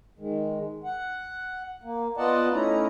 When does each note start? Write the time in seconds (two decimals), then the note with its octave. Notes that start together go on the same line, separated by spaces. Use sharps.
0.19 D#3 G#3
0.84 F#5
1.83 A#3
2.17 B3 F4 D5 D#5 F#5 A5
2.52 A3 C#4 D#4 E4 A#5